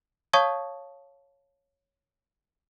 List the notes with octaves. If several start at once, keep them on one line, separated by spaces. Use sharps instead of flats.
C#5 F5 A5 C#6 D#6 G#6